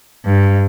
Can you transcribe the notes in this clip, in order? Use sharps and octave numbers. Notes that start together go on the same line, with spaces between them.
G2